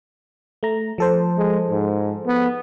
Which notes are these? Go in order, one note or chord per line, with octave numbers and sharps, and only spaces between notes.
A3 A#5
F3 A4 C5
G#3
G#2
B3